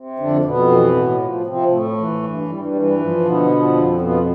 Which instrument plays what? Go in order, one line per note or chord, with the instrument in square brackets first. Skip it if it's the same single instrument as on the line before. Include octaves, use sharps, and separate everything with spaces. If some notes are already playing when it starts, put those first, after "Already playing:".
Already playing: [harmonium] C3
F2 D3 D4
F2 B2 B3
E3
A2
F3
C3 F3 C4
A2 A3
E3
G2
G2 G3
G3
E3
G3
F3
B2 D3 B3
F3
F2
B2 F3 B3